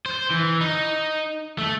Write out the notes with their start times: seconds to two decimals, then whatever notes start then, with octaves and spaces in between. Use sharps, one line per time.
0.06 C5
0.31 E3
0.61 D#4
1.58 A3